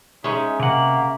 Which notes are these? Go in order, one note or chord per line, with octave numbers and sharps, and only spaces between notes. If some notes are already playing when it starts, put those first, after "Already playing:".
G#3 C#4 D#4 E5
C3 A#3 F#5